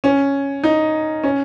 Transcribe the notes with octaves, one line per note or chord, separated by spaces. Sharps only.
C#4
D#4
C#4